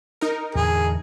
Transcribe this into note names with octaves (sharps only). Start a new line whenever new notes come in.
D#4 A#4
E2 A2 D3 G#4